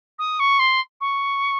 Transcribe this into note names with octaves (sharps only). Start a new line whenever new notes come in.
D#6
C#6
C6
C#6